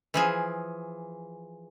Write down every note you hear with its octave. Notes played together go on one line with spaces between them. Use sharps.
E3 F3 G#4